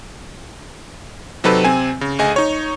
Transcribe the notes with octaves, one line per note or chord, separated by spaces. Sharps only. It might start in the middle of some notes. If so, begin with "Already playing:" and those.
C3 F#3 C4 D#4 A4 B4
C3 C4 G#5
C#3
D2 G#4 D#5 G#5
D#4 C#5